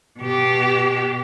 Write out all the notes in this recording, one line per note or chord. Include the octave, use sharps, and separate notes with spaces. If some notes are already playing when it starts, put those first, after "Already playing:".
B2 G4